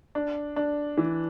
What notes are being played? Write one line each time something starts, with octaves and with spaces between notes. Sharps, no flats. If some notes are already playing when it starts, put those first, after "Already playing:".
D4
D4
E3